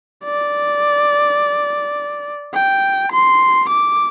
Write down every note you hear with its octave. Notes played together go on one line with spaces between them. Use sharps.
D5
G5
C6
D6